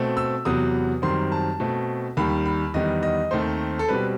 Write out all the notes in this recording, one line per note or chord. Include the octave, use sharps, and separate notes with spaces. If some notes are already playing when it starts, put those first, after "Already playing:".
Already playing: B2 A3 C4
E6
E2 C3 F#3 B3 D#6
F#2 D#3 G3 C4 C6
A5
B2 A3 C4
D#2 D#3 G3 B5
B5
E2 D#3 G3 B3 D#5
D#5
D#2 D#3 A3 C4 C5
A4
B2 G3 C4 B4